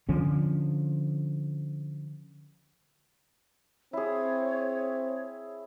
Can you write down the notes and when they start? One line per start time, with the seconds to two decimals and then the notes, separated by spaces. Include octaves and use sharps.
0.09 D3 F3 C#4
3.93 C4 E4 G#4 C#5